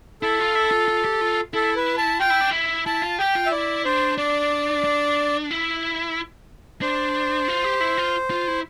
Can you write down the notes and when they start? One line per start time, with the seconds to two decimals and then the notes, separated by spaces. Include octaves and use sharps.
0.22 E4 A4
0.39 F4
0.55 E4
0.71 F4
0.88 F4
1.05 G4
1.21 F4
1.54 E4 A4
1.76 B4
1.98 A5
2.20 F4 G5
2.30 E4
2.41 D4
2.51 E4
2.86 E4 A5
3.02 F4
3.19 G4 G5
3.35 F4
3.46 E5
3.52 E4 D5
3.85 D4 C5
4.18 D4 D5
4.84 D4
5.51 E4
6.82 D4 C5
7.48 F4
7.64 G4
7.80 E4
7.97 F4
8.30 F4
8.48 E4